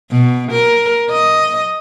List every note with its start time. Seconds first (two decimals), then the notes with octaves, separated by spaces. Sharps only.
0.11 B2
0.52 A#4
1.12 D#5